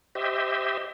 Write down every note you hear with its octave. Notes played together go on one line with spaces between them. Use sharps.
G4 C5 D#5 E5